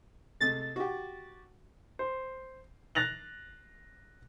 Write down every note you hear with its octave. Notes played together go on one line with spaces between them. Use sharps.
C3 G#3 A3 A6
F#4 G4
C5
F#6 A6 A#6 F7 F#7